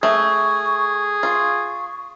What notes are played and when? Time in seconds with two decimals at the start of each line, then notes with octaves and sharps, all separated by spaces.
0.03 A3 G#4 C#6
1.23 F4 C#6